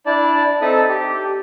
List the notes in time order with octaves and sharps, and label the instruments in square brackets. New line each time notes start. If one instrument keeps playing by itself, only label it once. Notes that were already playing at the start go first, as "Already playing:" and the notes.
[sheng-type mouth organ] D4 E4 D5 A5
C4 D#4 A4 E5 A5 D#6
G4